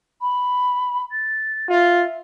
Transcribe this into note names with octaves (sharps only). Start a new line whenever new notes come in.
B5
A6
F4 E5